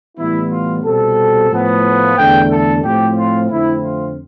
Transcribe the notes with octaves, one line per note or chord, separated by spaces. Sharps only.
A2 E3 G3 B3 E4
F4
C2 B2 G3 C4 A4
A2 F3 B3
E2 D3 A3 G5
A4
A2 F3 C4 G4
F4
F2 D3 A3 C4 E4
F4